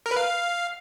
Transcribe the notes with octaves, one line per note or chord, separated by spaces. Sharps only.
A#4
B4
F5